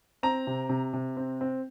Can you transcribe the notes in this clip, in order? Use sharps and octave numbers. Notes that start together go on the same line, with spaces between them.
C4 A#5
C3
C3
C3
C4
C4